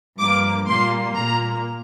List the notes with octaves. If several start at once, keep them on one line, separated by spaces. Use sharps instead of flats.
G2 F3 A#3 D6
A#2 G3 A#3 C6
A#2 A#3 A#5